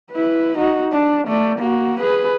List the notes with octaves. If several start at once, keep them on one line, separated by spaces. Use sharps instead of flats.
E4 B4
D#4 F#4
D4
A3 D5
A#3 F#4
G#4 B4